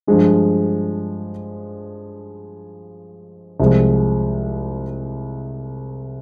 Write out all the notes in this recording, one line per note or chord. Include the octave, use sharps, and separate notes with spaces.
G2 F3 G#3 D4
C2 C3 F3 G#3